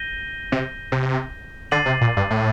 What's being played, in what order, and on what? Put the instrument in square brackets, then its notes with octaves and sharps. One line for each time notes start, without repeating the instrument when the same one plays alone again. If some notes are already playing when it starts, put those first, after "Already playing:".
Already playing: [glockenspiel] G6 A#6 D#7 G7
[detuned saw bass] C3
C3
[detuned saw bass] D3 [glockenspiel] D6 A6 C7 D#7 F#7
[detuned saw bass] C3
A#2
G2
A2